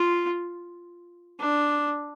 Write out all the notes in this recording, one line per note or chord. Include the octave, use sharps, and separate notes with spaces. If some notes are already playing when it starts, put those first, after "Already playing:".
Already playing: F4
D4